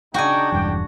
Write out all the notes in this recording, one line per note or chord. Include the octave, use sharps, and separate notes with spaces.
C#3 D4 D#4 F#4 G5 G#5
E1 E2 G2 G5